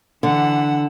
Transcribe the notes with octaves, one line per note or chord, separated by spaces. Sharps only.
D3 E3 F#5 E6